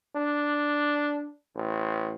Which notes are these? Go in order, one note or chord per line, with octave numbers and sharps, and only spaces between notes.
D4
A1